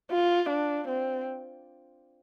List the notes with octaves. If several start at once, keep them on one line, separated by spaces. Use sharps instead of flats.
F4
D4
C4